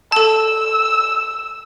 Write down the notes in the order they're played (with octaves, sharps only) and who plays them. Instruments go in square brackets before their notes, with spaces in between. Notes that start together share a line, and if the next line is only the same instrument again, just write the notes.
[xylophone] A4 A5 [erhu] E6